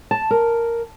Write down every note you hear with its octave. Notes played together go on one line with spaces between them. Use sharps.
A5
A#4